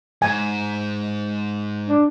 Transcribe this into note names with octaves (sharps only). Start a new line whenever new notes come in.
G#2 G#5
D4